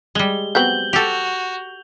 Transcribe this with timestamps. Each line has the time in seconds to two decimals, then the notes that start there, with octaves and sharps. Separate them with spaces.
0.15 G3 G#3 G7
0.55 F#3 B3 C4 G6 F#7 G7
0.93 F#4 G4 A4 F7